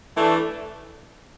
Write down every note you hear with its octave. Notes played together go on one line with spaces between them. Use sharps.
E3 A3 D4